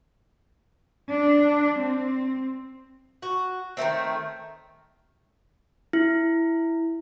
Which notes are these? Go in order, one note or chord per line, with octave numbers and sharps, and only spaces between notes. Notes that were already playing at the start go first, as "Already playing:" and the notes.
D4
C4
F#4
D#3 E3 A3 C4
E4